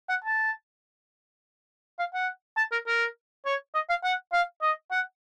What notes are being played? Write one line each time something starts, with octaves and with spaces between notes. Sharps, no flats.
F#5
A5
F5
F#5
A5
A#4
A#4
C#5
D#5
F5
F#5
F5
D#5
F#5